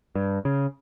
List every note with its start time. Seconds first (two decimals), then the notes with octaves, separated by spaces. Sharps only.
0.15 G2
0.45 C#3